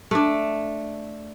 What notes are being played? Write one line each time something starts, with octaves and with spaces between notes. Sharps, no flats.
A3 D4